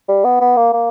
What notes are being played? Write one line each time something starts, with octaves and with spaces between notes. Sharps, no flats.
G3
B3
B3
A#3
A#3